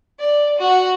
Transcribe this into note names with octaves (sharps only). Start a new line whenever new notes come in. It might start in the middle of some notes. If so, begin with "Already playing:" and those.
D5
F#4